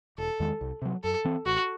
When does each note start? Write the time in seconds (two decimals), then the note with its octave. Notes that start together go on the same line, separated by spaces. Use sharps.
0.18 E1 A4
0.40 E2 D#3 G#3
0.61 C2
0.82 C3 F#3
1.04 F#2 A4
1.25 E3 C4
1.46 A1 F#4